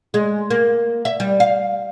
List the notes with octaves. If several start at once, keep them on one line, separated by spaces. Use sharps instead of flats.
G#3
A#3
E5
G3
F5